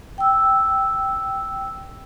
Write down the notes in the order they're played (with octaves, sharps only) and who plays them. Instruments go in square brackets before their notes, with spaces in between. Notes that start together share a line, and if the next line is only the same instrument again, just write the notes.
[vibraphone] G5 E6